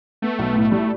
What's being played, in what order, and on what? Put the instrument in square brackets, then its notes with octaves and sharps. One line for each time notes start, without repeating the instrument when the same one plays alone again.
[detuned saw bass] A3 [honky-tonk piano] B3
[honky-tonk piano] B1
A2
G3